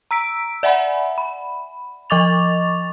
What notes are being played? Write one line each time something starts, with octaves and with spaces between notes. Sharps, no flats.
A#5 E6 B6 D7
D5 E5 F#5 G#5 B5
B5
F3 D#5 C#6 D6 A6 F7